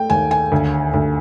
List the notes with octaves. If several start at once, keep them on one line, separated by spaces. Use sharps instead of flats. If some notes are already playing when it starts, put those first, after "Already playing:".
Already playing: A3 G5
D#2 G#5
G#5
D2
D2